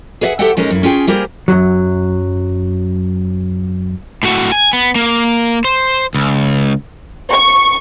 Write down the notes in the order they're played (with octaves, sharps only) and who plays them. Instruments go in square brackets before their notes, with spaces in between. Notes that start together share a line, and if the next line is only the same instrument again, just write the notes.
[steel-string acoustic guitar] G#4 B4 C#5 E5 F#5
G4 A4 C5 E5 F#5 G5
A#2 G#3 C#4 D#4 A#4
F#2 E4
C#4 F4 G#4 G5
G3 A#3 G4 G#4 A#4 C5
[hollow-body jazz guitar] F#2 F#3
[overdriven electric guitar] A2 F#4
G#5
B3
A#3
C5
C#2
[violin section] C#6